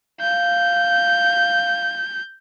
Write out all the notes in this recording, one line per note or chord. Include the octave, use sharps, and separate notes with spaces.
F5 G6